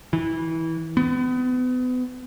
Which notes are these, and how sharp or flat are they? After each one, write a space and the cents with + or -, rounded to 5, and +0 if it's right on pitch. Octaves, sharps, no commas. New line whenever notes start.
E3 -20
B3 +35